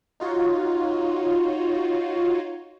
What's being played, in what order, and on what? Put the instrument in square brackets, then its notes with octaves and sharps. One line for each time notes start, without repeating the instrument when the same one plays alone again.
[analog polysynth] D#4 F4 F#4 C#5